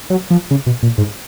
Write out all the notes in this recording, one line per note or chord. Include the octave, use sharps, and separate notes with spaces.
F#3
F3
C#3
B2
A#2
G#2